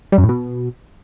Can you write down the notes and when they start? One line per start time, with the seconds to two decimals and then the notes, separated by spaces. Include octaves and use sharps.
0.12 G3
0.18 F#2
0.23 A2
0.29 B2